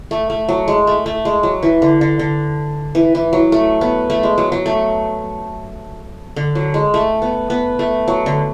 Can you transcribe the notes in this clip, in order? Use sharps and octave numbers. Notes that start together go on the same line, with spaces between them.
A3
A3
F#3
G#3
A3
A3
G#3
F#3
E3
D3
D3
D3
E3
E3
F#3
A3
B3
A3
G#3
F#3
F#3
A3
D3
F#3
G#3
A3
B3
B3
A3
F#3
D3